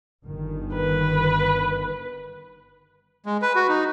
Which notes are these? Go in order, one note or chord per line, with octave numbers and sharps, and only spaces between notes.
G1 D#3
B4
G#3
B4
F#4
D#4